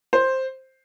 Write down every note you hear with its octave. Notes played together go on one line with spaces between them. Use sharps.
C5